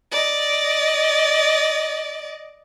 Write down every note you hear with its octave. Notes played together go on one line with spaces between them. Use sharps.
D5 D#5